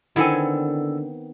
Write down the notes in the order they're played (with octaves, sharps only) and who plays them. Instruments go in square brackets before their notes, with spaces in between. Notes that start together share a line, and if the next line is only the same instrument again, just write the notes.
[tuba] D3 [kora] D#3 B3 C4 [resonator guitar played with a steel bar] E4 A4 G#5